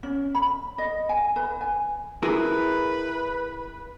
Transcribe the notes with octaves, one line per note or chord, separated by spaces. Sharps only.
C#4
B5
D#5
G#5
B4
G#5
E4 G#4 A#4 B4